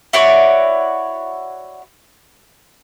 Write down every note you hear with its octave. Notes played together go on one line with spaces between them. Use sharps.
E4 F#4 C#5 D5